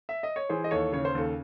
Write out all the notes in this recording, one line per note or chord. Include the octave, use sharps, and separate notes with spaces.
E5
D#5
C#5
E3 G#4 C5
D#5
D#2 A4 C#5
C#3 C#5
C5
D#2 A4